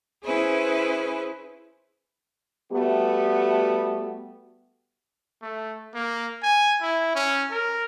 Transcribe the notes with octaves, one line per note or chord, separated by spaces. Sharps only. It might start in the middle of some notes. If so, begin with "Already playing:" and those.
C#4 E4 G#4 B4 C5
G3 A3 B3 F#4 G4
A3
A#3
G#5
E4
C#4
A#4